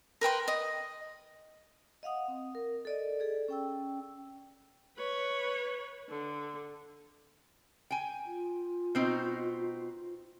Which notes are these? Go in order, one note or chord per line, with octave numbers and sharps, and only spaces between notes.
A#4 B4 G5 C6
D#5
D#5 F5 F#5 D#6
C4
A#4
A4 D5 D#5
G#4 A4 D5
C#4 G5 E6
B4 C#5
D3
G5 G#5
F4
B2 C4 D#4